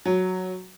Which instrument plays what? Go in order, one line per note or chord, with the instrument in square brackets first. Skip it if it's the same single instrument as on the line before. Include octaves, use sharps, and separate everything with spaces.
[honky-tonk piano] F#3